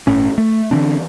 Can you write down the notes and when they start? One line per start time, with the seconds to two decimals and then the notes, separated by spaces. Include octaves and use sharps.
0.07 G1 A2 C#4
0.38 A3
0.71 D3 E3 C4 D4